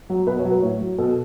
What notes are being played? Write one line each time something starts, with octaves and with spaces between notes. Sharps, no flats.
F#3
B2 B4
C#5
F#3
B4
A2 C#5
F#3
B2 A4